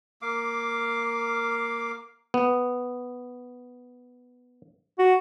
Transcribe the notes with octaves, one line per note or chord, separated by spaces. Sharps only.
A#3 F5 D6
B3
F#4